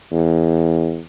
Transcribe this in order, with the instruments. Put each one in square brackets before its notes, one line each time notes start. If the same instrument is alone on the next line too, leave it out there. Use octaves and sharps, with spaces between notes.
[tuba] E2